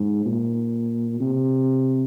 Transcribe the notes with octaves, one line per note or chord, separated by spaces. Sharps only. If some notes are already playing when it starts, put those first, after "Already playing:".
Already playing: G#2
A#2
C3